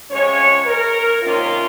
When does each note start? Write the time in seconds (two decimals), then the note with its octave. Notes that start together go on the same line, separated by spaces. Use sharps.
0.11 C3 F3 G#3 C#4 C#5
0.66 A#4
1.22 C3 D#3 A#3 C#4 F4